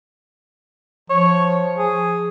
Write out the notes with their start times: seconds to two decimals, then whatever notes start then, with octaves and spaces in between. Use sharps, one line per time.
1.10 F3 C#5
1.78 G#4